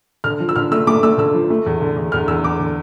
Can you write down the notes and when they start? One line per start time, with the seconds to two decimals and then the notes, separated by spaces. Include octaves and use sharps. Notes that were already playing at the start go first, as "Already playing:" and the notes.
0.24 D3 F6
0.40 F3
0.49 E6
0.56 D3 F6
0.72 A3 E6
0.87 A3 D6
1.03 A3 E6
1.18 D3 E6
1.34 F3
1.50 A3
1.66 E2
1.81 D3
1.96 E2
2.12 E2 F6
2.28 E2 E6
2.43 E2 D6
2.59 D3